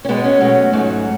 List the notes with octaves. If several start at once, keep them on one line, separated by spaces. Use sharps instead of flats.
C#4
B2 G#3 B3
C#4
B2 F#3 A3
G#2 F#3 A3